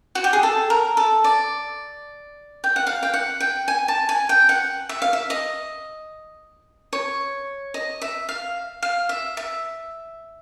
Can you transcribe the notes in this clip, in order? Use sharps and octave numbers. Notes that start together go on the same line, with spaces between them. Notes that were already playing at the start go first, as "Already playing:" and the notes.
F#4
G4
G#4
A4
A#4
A4
D5
G5
F#5
F5
G5
F#5
G5
G#5
A5
G#5
G5
F#5
E5
F5
E5
D#5
C#5
D#5
E5
F5
F5
E5
E5